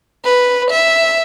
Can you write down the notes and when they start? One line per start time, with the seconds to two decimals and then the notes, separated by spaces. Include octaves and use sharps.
0.25 B4
0.70 E5